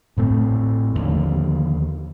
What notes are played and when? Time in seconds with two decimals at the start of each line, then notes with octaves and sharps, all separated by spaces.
0.17 A1 A2 A3 C4
0.95 D#2 D3 F3